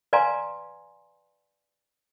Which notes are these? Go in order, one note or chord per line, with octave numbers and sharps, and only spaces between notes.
B4 D5 F5 G#5 A#5 C6